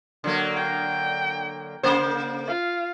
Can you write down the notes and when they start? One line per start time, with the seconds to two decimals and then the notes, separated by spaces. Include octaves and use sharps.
0.24 D3 F#3 A#3
0.56 G5
1.83 C#3 A#3 C5
2.47 F4 F5